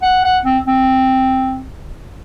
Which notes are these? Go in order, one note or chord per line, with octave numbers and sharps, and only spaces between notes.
F#5
F#5
C4
C4